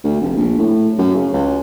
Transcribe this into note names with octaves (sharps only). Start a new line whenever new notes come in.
D2
F1
A#1
A2
F#2
C#3
C#2